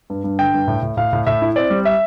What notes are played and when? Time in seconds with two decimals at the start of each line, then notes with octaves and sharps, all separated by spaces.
0.10 G2
0.24 G2
0.39 D3 G5
0.54 G2
0.68 A2
0.83 A2
0.97 A2 F5
1.13 A2
1.27 A2 E5
1.42 E4
1.56 C4 D5
1.70 G3
1.85 E5